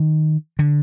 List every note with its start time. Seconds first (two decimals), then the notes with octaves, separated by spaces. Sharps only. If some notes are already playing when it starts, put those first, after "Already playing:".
Already playing: D#3
0.59 D3